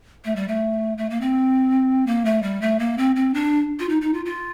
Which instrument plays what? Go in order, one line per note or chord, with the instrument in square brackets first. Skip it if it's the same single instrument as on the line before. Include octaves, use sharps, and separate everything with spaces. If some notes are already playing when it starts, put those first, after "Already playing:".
[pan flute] A3
G3
A3
A3
A#3
C4
A#3
A3
G3
A3
A#3
C4
C4
D4
F4
D#4
D#4
F4
F4